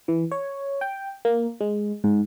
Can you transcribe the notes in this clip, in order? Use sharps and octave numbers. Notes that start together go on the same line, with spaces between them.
E3
C#5
G5
A#3
G#3
G#2